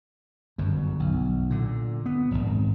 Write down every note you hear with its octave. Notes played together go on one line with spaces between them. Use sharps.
G1 F#2
B1
A#2 D3
B3
D#1 G#1